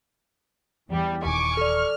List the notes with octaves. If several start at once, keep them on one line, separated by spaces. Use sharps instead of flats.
E2 E3 G3
D#1 D#3 G#5 C#6 D6
A4 D5 F6